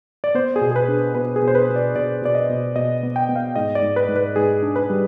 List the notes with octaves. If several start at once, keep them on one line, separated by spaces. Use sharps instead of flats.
D5
B3 C5
G#4
B2
G#4
B4
D4
B2 B4
G#4
B2
C5
B4
B2
D5
B2 D5
B2 D5
D#5
B2
B2 D#5
B3
G5
B3
F5
G#2 D#5
D5
G#2
B4
G#2
B4
G#2 G#4
D4
B4
G3